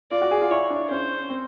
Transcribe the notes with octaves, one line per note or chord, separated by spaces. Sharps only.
F4 D5
F#4
G#4
F4
E4 C#5
D4
C#4 C5
C4